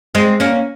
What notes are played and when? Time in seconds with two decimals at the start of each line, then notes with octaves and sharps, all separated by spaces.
0.15 G#3 C4
0.40 A#3 C#4